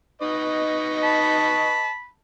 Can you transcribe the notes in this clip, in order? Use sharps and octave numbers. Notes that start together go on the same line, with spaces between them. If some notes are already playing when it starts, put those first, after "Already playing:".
D#4 B4 D#5 C#6
A5 B5